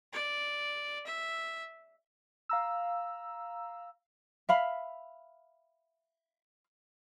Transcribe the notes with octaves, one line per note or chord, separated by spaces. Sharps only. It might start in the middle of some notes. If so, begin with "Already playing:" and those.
D5
E5
F5 A#5 E6
E5 F5 B5